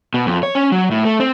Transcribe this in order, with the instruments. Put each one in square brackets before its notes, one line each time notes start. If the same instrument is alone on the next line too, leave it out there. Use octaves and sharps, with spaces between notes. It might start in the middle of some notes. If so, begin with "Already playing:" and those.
[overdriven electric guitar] B2
F2
C#5
C#4
F#3
A2
A3
C4